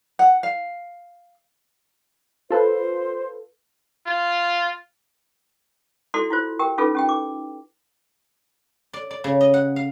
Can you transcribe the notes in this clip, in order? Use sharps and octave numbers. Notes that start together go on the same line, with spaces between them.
F#5
F5
F4 A4 B4 C5
F4
E4 F#4 A4 D5 C6
E4 F4 C5
G4 A#4 G5
C#4 D#4 F4 G#4 A4 B4
C#4 G4 G5
D6
D5
D5
C#3
D#5
F#5
F5